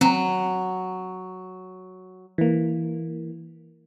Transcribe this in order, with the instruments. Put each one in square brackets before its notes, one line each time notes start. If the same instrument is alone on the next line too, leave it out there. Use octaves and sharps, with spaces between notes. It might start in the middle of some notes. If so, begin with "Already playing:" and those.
[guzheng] F#3 [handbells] C4 A#5
[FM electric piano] E3 A#3